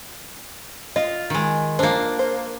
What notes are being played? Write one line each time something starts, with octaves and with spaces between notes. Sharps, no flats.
F4 D#5
D#3 G#3
F3 A#3 D4 C5
C5